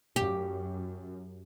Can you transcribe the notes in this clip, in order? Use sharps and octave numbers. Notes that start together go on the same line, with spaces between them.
F#2 G4